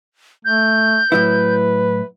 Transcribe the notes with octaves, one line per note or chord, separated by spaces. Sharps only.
A3 G6
A2 F#3 E4 B4